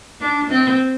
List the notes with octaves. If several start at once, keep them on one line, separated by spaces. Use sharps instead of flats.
D4
C4